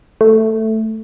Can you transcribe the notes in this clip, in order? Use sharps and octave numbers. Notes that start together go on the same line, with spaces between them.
A3